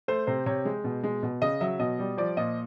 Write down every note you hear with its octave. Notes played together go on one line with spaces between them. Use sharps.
A3 C5
C3 C5
C3 C#5
G#3
B2
G#3
B2
C#3 D#5
F#3 E5
B2 D#5
G3
F3 D5
A#2 D#5